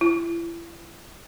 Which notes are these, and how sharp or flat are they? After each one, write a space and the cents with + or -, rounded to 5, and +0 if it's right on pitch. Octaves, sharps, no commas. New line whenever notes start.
E4 +35